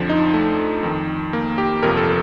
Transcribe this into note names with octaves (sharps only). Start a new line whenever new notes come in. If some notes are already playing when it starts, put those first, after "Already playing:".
Already playing: F2 D3 F3
D#4
A3
F2 D#3
A#3
G4
G1 F2 C3 F3 A#4
A4